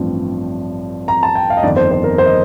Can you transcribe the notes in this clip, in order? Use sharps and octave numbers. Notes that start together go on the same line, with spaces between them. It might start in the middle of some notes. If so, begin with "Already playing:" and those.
Already playing: A1 G2 F3 C4
A#5
A5
G5
F5
D#5
G1 F2 D#3 D5
C5
C5
A#4
C5
D#5